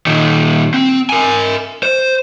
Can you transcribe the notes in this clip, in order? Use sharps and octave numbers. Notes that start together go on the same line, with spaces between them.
A#2 D#3
C4
A#4 G#5
C5